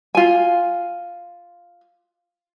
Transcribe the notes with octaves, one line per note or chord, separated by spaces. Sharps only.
F4 G#5